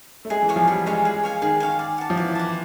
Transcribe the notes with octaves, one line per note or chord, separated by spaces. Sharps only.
A3
G#3 G#4
E3
C#5 F5 G#5
F3
G3 G#4
G#3 C#5 F5 G#5
G#4
C#5 F5 G#5
D#3 G#4
C#5 F5 G#5
D5
F#5 A5
F3
E3 D5
F#5 A5